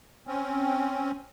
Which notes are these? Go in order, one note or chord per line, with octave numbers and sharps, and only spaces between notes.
C4 C#4